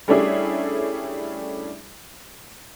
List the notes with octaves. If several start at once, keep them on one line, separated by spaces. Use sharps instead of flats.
G3 A3 C#4 D4 E4 G#4